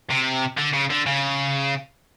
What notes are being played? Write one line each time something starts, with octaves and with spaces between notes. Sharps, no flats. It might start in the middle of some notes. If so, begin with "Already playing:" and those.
C3
D3
C#3
D3
C#3